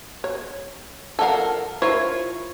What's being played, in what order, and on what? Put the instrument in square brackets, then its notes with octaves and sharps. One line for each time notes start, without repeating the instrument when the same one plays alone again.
[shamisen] C#5
[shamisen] F3 F#5 [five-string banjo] A4 A#4 F5
[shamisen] E4 A#4 C5 [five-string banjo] F4 C#5